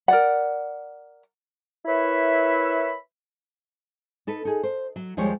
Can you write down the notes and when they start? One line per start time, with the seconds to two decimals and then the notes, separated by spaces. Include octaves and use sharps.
0.08 A#4 D5 F#5
1.86 E4 A#4 B4 C#5 E5 B5
4.27 D#4 A4 B4
4.45 D#4 G#4
4.63 C5
4.96 F#3
5.17 D#2 F3 G3 G#3 G4 C#5